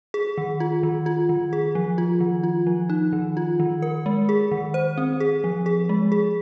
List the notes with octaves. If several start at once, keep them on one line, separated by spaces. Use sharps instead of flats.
G#4
D#3
F4
D#3
F4
D#3
G#4
F3
F4
D#3
F4
F3
D#4
D#3
F4
D#3
A#4
G#3
G#4
D#3
C5
C4
G#4
F3
G#4
G#3
G#4